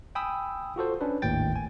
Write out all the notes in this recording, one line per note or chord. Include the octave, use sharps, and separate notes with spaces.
G5 G#5 B5 D#6 E6
F4 F#4 A4 C5
C#4 D4 B4
G#1 D#2 A2 G5 A6
G#5